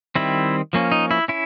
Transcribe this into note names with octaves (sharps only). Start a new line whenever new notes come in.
D#3 G3 C4 E4
F3 A#3 C#4
D#4
E4
C#4 E4